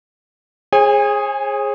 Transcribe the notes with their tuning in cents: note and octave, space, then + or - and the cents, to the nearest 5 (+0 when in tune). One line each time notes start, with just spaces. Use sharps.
G#4 +0 C#5 -45 G#5 -35